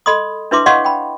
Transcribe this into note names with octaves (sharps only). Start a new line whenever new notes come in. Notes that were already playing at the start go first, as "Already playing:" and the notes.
A4 D#5 B5 C6 D#6
D4 E4 B4 E5 C6 D6
C#5 D#5 F5 F#5 C6 C#6
G5 B5